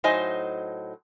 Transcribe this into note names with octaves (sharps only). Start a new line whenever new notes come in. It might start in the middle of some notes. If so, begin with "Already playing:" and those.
A2 F#3 D#4 C5 D#5 G#5